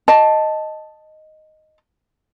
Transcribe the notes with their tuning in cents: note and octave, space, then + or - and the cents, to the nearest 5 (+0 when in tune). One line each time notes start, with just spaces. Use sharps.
D#5 +0 A5 +0